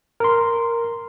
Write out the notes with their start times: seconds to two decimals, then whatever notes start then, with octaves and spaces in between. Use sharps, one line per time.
0.20 A#4 C6